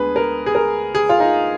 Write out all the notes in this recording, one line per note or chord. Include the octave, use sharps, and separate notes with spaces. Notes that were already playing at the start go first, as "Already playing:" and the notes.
Already playing: D2 D3 G#3 B3 G#4 B4
A#4
G#4
A#4
G#4
F4
D#4